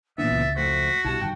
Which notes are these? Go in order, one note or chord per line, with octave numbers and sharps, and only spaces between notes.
A#2 E3 B3 D4 E5 A6
C#2
F2 A3 F#4 C5 B6
B1 G2 E4 G4 A5
G2 D#3 G5